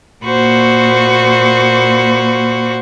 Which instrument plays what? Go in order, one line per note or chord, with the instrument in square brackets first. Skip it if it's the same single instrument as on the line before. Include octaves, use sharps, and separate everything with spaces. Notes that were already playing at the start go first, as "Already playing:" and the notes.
[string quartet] A#2 A#3 F#4 C5 B5 C#6